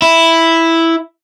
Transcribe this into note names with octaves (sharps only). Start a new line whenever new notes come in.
E4